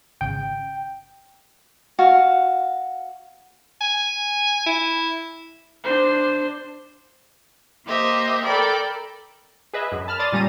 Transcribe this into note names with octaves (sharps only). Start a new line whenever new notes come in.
G#1 C#3 G5
F#4 F5
G#5
E4
D4 C5
A#3 G4 C5 D#5 E5
A4 A#4 D5 G5 B5
G#4 B4 D#5 E5
F#2
A5 B5 F6
D5 A5 C6 D#6 A6
A#2 G3 C#4 A#5 D#7